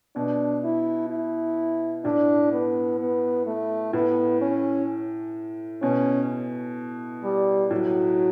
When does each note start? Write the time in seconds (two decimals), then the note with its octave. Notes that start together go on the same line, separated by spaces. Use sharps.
0.16 B2 D4
0.63 E4
1.10 E4
2.05 A2 D4
2.52 B3
3.00 B3
3.47 A3
3.93 A2 B3
4.41 C#4
5.82 B2 C#4
7.24 G3
7.71 A2 F#3